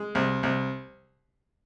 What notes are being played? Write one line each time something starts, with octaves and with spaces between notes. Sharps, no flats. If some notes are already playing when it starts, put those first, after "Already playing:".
Already playing: G#3
C2
C2